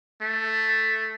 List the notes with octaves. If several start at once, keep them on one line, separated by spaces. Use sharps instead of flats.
A3